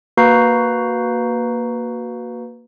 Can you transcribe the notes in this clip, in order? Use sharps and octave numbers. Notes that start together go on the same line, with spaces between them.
A#3 F#4 B4 A#5 G6 C7